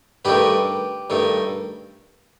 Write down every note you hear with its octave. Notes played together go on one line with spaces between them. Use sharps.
G2 D#3 A3 G4 B4
G2 D#3 A3